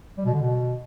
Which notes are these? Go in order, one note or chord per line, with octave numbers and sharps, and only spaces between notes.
G3
B2
D3
B2